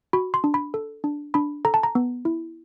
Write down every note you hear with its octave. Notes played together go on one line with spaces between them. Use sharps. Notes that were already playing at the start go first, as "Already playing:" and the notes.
F#4 B5
C6
D4
B5
A4
D4
D4 B5
A4 A#5
A5
A#5
B3
E4